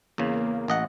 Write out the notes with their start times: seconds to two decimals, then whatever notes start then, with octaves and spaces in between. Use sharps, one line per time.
0.18 E2 C#3 A#3
0.68 A1 D#5 F#5